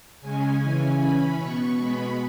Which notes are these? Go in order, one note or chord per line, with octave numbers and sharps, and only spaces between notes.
C#3 G#3 C#4 G#5
C#3 E3 C#4
E3 C#4 B5
B2 B3 C#6
B2 G#3 B3 B5